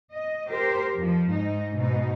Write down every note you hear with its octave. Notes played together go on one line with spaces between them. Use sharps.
D#5
G4 A#4 C5
F2 F3
G#2 D#4
G#2 B2 D#4